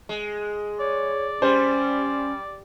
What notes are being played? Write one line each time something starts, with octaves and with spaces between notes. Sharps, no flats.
G#3
C#5 D5
G3 C#4 C5